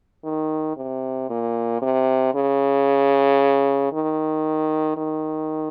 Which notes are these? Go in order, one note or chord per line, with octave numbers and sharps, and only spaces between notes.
D#3
C3
A#2
C3
C#3
D#3
D#3